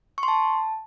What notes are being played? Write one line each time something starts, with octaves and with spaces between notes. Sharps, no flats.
C#6
C6
A5